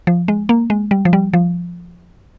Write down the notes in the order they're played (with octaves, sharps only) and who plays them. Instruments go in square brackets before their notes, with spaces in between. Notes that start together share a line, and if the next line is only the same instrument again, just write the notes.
[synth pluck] F3
G#3
A#3
G#3
G3
F3
G3
F3